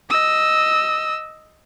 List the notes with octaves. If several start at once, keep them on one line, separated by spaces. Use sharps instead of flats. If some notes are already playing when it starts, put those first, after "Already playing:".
D#5 E6